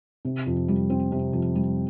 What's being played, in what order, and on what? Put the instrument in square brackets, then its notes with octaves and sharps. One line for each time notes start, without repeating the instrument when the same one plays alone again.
[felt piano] C3
F2
G3
C4
C3
F2
G3